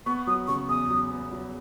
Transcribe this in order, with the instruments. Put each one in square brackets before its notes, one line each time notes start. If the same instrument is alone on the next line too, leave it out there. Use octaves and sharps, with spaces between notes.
[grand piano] B3 [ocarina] C#6
[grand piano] F#3 [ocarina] D#6
[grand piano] C#3 [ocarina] C#6
[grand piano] E2 [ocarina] D#6
[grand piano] F#3
B3
F#3